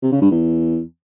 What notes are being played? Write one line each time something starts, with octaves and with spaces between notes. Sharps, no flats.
C3
C#3
G2
E2